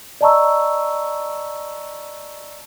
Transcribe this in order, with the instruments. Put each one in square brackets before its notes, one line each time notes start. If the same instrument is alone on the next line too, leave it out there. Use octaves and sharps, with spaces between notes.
[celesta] D5 D#5 A5 A#5 C#6 E6